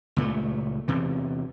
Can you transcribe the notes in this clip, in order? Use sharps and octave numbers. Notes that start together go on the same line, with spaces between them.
C#2 A#2 G#3 A3
E2 C3 E3